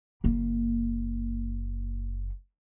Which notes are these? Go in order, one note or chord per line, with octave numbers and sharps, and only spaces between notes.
F#1 A#3